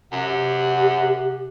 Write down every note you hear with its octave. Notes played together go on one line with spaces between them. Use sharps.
F#2 C3 G4 F#5